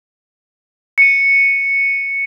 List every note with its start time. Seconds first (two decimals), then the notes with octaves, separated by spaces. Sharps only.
0.98 C#7 D#7